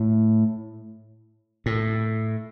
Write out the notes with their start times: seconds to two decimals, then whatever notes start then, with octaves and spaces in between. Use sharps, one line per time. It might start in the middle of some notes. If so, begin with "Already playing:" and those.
Already playing: A2
1.66 A2